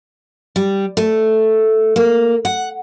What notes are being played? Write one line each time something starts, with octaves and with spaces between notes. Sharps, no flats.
G3
A3
A#3
F#5